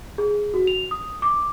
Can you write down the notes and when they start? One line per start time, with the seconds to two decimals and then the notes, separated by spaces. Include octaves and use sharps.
0.18 G#4
0.54 F#4
0.67 F7
0.91 D#6
1.22 D6